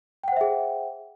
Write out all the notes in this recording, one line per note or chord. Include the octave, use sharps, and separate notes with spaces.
G#4 C5 E5 F#5 G5